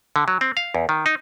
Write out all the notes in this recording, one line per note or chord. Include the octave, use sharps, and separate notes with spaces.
D3
F#3
C4
F5
E2
D#3
D#4